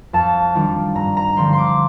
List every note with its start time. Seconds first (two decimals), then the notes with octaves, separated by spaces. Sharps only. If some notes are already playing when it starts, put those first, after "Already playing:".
0.13 F2 A5
0.55 D#3 G3 D4 F4
0.95 G2 A#5
1.17 A#5
1.37 D3 F3 C4 C6
1.53 C6
1.58 D6